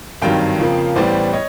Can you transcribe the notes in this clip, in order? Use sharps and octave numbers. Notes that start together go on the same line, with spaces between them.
G#1 G2 D#3 F#3 F5 G5
F2 C#3 F3 A#3
A1 A2 E3 G3 B3 C5 D5
C#5 D#5